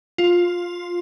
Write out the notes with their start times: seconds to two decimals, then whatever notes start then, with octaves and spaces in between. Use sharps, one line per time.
0.18 F4